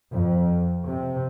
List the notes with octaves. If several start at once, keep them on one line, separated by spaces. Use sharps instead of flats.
F2
C3